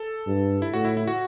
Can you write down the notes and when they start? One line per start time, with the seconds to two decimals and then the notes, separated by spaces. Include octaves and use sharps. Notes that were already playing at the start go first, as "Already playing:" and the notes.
Already playing: A4
0.27 G2
0.62 E4
0.73 A2 F#4
0.85 E4
0.97 E4
1.07 F#4